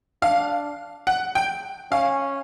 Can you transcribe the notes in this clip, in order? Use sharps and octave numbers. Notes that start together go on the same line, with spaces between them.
D4 F5
F#5
G5
C#4 F5